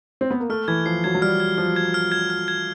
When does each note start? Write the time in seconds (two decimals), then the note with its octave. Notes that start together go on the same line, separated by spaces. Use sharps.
0.21 C4
0.31 B3
0.40 A#3
0.50 A3 F6
0.68 E3 G#6
0.86 F3 C7
1.04 F#3 G#6
1.15 F#3
1.21 G3 F6
1.40 G#6
1.58 F3 F6
1.76 G#6
1.94 F6
2.12 G#6
2.30 F6
2.48 G#6